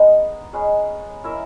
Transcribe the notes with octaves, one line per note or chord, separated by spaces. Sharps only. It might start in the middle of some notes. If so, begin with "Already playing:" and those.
Already playing: G#3 B3 D#4 G#4
G#3 C#4 G#4 B4
C#4 E4 A#4 E5